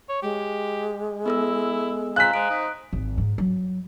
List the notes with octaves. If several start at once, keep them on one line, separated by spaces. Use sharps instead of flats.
C#5
G#3 G4
B3 E4 A4 E6
C4 F5 G#5 A#5 F#6 B6
G#3 C5 D7
D#4
G#1
G#2
F#3